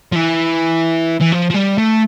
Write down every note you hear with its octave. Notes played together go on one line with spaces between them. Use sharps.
F3
E3
E3
F3
F3
G3
A3